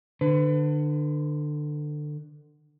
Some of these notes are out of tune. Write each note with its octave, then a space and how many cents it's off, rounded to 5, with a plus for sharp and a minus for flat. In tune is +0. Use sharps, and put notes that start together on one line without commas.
D3 +25 B4 +40